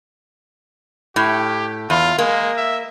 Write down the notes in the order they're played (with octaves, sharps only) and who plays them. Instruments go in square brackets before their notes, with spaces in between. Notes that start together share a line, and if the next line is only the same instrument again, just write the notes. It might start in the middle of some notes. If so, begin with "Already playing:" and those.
[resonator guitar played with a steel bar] A2 [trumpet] G4
[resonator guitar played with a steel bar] E2 [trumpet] F4
[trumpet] G#3 [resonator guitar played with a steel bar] A#3
[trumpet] E5